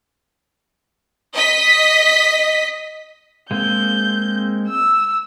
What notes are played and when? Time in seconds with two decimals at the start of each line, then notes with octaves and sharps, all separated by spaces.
1.34 D#5 B6
3.51 G#3 A#3 C4 G6
4.68 E6